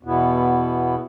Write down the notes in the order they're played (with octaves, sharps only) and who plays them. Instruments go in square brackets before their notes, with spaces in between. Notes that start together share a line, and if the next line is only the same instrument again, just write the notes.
[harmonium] E2 B2 B3 E4